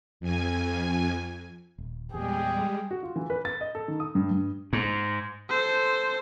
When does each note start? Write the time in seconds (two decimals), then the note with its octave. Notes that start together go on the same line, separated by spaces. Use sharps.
0.20 F2 G#5
1.78 D#1
2.14 E2 A#2 G3 G#3 G4 G#4
2.91 F#4
3.03 F4
3.16 E3
3.30 B4
3.45 A6
3.61 D#5
3.75 A4
3.88 D#3
4.00 D#6
4.15 G2
4.31 G2
4.73 G#2
5.50 A4 C5